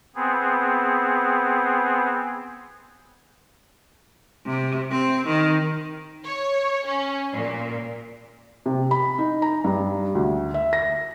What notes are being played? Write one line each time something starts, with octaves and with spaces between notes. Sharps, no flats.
B3 C4 G#4
C3
C4
D#3
C#5
C#4
A#2
C3
B5
D#4
A#5
G2
D2
E5
A#6